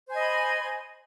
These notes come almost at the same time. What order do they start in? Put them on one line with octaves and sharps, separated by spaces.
C5 G#5 D#5 B5